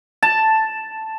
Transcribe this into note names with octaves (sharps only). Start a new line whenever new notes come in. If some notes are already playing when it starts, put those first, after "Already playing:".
A5